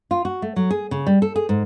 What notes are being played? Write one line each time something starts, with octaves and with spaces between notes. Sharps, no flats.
F4
F#4
A3
F#3
G#4
C#3
G3
A4
G#4
G#2